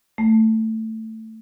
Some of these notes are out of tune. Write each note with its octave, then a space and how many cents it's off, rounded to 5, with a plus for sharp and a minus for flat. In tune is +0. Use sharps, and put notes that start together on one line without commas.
A3 +10